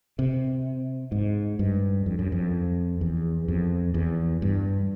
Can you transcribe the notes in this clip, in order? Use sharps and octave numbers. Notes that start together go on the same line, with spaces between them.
C3
G#2
G2
F2
F#2
F2
E2
F2
E2
G2